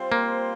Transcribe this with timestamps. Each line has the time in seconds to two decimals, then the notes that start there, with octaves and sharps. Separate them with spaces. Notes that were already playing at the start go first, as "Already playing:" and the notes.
Already playing: G3 C4 F4 C5
0.12 A#3